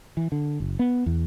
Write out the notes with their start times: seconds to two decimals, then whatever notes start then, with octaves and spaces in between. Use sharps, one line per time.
0.17 E3
0.32 D3
0.60 F#1
0.79 B3
1.06 E2